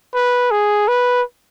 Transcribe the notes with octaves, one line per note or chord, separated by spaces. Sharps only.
B4
G#4
B4